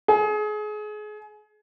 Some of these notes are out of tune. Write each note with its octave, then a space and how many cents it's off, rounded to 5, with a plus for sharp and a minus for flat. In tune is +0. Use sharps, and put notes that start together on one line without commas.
G#4 +30